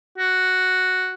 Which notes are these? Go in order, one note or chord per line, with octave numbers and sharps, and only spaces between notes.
F#4